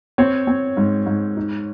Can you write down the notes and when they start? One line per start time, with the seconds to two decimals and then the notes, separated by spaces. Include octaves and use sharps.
0.18 C4 C#5
0.47 C4
0.77 G#2
1.06 G#2
1.37 D#4